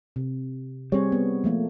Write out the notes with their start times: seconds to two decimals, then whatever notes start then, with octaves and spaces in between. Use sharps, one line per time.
0.16 C3
0.92 G3 C4 G#4 C#5
1.12 B3
1.44 F3 A3 A#3